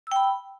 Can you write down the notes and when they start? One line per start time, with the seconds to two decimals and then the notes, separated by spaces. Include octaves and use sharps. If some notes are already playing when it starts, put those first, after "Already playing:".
0.07 E6
0.12 G5
0.16 B5